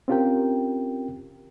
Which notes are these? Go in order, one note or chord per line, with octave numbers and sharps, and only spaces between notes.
C4 C#4 F4 G4 A#4 G5